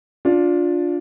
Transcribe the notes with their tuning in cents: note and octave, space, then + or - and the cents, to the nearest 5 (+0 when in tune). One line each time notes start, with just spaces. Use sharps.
D4 -10 F4 +15